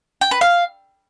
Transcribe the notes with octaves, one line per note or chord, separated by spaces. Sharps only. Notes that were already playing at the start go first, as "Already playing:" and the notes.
G5
B4
F5